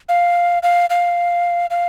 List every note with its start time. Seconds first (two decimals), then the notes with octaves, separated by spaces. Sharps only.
0.09 F5
0.63 F5
0.90 F5
1.70 F5